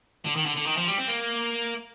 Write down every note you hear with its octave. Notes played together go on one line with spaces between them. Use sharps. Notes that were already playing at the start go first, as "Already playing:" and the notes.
D3
D#3
D3
D3
D#3
F3
G3
C4
A#3